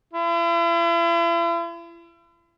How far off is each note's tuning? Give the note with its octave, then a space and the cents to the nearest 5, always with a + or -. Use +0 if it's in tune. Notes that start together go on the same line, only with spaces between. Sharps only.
E4 +45